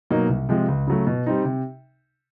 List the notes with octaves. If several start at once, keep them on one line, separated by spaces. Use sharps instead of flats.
B2 F#3 A#3 D#4
C2
C3 F3 G#3
C#2
C#3 F#3 A3
B2
G3 C4 D#4
C3